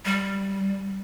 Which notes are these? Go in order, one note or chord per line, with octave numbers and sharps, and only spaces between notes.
G3